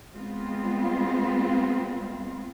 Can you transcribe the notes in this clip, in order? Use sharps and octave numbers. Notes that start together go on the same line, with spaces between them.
G#3 B3 C4 F4